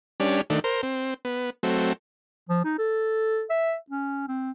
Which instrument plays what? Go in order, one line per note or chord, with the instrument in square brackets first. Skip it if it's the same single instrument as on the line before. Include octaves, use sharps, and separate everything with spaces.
[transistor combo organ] G3 C#4 D4
D#3 A3 D4
A#4 C5
C4
B3
F#3 A3 C4
[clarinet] F3
D#4
A4
E5
C#4
C4